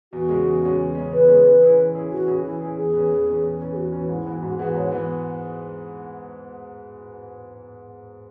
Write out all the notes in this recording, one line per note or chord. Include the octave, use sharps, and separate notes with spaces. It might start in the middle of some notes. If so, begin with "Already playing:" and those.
E2 F#4
C#3 G#3 C#4
E2
C#3 G#3 C#4
E2
C#3 G#3 C#4
E2 B4
C#3 G#3 C#4
E3
C#4 E4 G#4
E3
C#4 E4 G#4
E3 F#4
C#4 E4 G#4
E3 E4
C#4 E4 G#4
E2 G#4
E3 C#4
E2
E3 C#4
E2
E3 C#4
G#4
E2 F#4
E3 C#4 F#4
G#2 E4
E3 B3 F#4
G#2 F#4
E3 B3 F#4 G#4
G#2 C#5
E3 B3